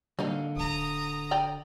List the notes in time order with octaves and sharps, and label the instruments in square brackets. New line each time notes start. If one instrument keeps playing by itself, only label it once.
[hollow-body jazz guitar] D3 F5 [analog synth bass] G3 [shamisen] A#3 D#4
[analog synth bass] D1 [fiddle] A#5 D#6
[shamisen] D5 G5 A#5